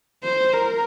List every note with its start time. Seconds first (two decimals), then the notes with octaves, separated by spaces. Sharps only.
0.24 C5
0.53 A#4